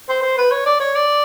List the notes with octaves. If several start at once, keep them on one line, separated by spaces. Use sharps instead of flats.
C5
C5
B4
C#5
D5
C#5
D5